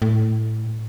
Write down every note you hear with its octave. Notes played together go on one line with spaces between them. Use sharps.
A2